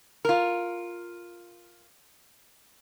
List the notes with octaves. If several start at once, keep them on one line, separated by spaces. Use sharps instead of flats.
F4 A#4